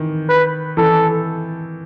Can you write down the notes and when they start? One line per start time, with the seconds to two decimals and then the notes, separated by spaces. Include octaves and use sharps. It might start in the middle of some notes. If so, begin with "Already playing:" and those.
Already playing: D#3 E3
0.29 B4
0.77 E3 A4